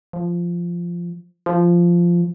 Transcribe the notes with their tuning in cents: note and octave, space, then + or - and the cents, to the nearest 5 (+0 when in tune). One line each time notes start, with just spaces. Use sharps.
F3 -10
F3 -10